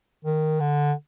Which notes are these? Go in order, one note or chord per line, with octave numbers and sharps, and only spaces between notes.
D#3
D3